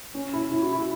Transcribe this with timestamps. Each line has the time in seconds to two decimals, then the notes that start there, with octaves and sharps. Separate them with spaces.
0.14 C#4
0.33 E4
0.52 E4
0.62 F#4
0.73 E4